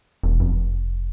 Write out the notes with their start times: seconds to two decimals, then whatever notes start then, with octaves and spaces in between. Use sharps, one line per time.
0.24 E1
0.40 F1